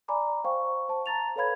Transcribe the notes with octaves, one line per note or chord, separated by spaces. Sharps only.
D5 G#5 A#5 B5 D6
C5 F5 G5 C#6
C5 A5
A5 A#5 A6 F7
A4 B4 C#5 F5 B5 G#6